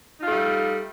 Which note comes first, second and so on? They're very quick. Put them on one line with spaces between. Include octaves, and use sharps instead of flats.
D#4 F4 A3 G3